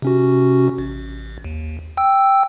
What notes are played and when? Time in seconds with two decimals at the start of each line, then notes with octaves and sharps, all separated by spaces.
0.02 C3 C#4 F#4
0.78 A1
1.44 D#2
1.97 G5 E6